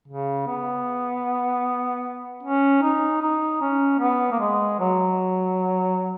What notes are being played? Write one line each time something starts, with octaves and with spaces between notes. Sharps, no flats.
C#3
B3
C#4
D#4
D#4
C#4
B3
A#3
G#3
F#3